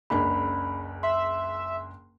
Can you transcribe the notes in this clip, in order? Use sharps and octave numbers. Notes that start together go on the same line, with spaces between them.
F#1 C#2 D4 B5
E5 C6